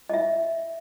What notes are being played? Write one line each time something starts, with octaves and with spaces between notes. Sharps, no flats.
D#5 E5